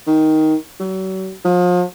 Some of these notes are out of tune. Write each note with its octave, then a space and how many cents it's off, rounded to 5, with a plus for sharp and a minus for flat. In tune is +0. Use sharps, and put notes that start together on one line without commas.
D#3 +10
F#3 +40
F3 +35